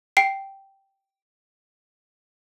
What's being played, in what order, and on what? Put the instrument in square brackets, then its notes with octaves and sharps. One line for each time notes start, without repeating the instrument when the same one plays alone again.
[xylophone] G5 C7 D7